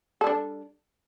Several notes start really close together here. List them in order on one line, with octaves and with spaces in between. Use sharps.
A4 G3 D4